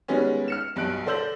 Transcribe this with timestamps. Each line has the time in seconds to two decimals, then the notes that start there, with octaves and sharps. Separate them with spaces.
0.08 D#3 G3 G#3 B3 C#4
0.48 F6 C#7 E7
0.76 B1 G2 B2 F#6 D7
1.06 D3 D4 C5 E6 G6 F#7